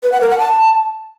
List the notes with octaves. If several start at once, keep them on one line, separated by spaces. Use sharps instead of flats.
B4
F#5
A#4
F#5
A5